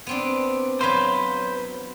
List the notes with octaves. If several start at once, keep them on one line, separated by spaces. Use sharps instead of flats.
B3 C4 D4
F#3 B4 C5 F5